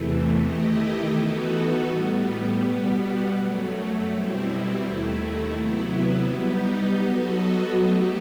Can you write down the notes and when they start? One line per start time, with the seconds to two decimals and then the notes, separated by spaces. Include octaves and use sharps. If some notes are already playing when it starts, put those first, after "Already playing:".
Already playing: E2 C3 E3 A3
0.35 D#3 A3 E4 G4 D#5
1.09 E3 B3 D#4 F#4 A4
1.83 A2 G3 B3
2.57 B2 G3 B3
3.31 F#2 F#3 A3
4.05 B2 G3 C4 E4
4.79 D#2 D#3 A3 E4
5.53 C3 F#3 B3 E4
6.27 G3 B3 D#4 G4
7.01 F#3 B3 F#4 A4 D#5
7.76 F#3 A3 D#4 G4